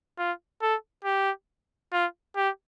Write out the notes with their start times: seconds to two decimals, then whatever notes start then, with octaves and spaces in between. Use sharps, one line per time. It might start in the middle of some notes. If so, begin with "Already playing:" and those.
0.18 F4
0.62 A4
1.05 G4
1.92 F4
2.36 G4